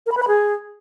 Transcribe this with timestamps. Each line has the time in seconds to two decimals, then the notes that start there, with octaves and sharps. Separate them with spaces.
0.06 A#4
0.12 B5
0.17 B4
0.22 B5
0.28 G#4